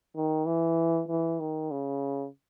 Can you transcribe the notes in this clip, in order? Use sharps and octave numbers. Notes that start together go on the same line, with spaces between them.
D#3
E3
E3
D#3
C#3